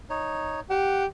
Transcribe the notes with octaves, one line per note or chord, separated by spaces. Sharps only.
D#4 C#5
G4 F#5